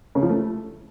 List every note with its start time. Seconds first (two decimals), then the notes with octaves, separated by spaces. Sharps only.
0.15 C#3
0.22 F3
0.30 A3